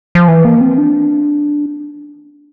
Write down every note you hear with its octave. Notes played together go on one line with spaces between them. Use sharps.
F3
E3
A#3
C4
D4